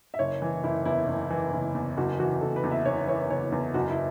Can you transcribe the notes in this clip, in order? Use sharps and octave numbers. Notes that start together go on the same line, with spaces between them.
E5
F#1 C#5
E3
F#1 E4
E2 E4
F#1
E3
F#1
E2
F#1 F#4
E3 F#4
F#1 A4
B4
E2
E5
F#1 C#5
E3 C#5
F#1 C#5
E2
F#1 F#4
E4